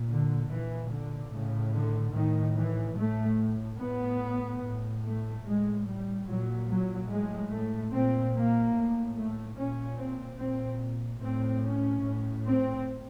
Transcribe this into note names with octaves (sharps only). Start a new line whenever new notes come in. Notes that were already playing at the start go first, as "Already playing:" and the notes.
Already playing: A#2
D3
A#2 E3
D3
A2 C#3
D3
A2 D#3
E3
A2 A3
A2 B3
A2
A3
A2 G#3
G3
A#2 F#3
F#3
A2 G#3
A3
A#2 C4
A#3
A2
A3
A#2 C#4
C4
A#2 C4
A2 C4
C#4
A2
C4